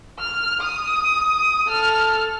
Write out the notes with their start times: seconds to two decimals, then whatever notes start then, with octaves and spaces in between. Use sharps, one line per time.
0.19 F6
0.61 D#6
1.69 A4 F6